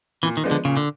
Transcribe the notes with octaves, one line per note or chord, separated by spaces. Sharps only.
A#2 E3
D#3
F3 G#3 B3 D4
D3
A#2 C#3
D3